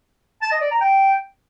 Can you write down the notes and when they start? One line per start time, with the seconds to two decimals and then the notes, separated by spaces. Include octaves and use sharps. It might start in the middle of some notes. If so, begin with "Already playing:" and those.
0.42 A5
0.52 D#5
0.61 D5
0.71 A#5
0.81 G5